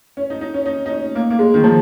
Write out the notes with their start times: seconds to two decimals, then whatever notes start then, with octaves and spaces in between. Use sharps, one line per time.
0.17 C#4
0.30 D#4
0.41 D#4
0.54 C#4
0.66 D#4
0.86 D#4
0.90 C#4
1.15 A#3
1.30 A#3
1.39 G#3
1.54 D#3
1.64 F3